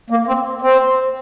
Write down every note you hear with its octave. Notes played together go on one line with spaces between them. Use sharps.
A#3
C4
C4